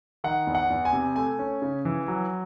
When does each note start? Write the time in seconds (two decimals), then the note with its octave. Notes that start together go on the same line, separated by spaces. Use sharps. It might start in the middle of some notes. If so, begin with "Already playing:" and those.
0.24 D#3 F#5
0.47 E2
0.55 F#5
0.70 E2
0.85 G#5
0.93 C3
1.16 A3 G#5
1.39 C#4
1.62 C#3
1.85 E3
2.08 F#3